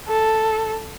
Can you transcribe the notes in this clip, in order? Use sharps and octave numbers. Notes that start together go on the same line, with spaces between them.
A4